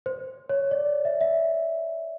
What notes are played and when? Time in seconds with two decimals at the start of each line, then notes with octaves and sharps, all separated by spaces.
0.06 C5
0.49 C#5
0.71 D5
1.05 E5
1.21 E5